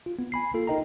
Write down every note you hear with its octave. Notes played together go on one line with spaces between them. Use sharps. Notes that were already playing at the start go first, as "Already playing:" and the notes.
F4
B3
G#5 B5 C7
A#3 F4 A4
D#4 A#4 D#5 G5 A#5